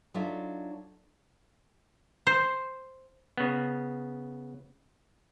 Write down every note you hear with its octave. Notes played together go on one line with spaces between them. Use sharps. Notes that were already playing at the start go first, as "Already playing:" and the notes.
F#3 D4 D#4 F4 A4 E5
C5
C#3 B3